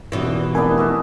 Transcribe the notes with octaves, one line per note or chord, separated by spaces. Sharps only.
D#1 E2 B2 E3
F1 B3 D4 E4 A#4 G#5
F#4 A4 D#5